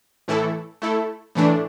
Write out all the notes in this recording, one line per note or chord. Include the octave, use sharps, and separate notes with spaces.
A2 E3 A3 E4 A4
A3 E4 A4
A2 E3 A3 D4